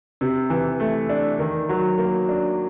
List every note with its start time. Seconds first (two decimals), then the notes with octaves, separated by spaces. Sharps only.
0.21 C3
0.50 E3
0.80 A3
1.10 D4
1.39 D#3
1.69 F#3
1.98 A#3
2.29 D4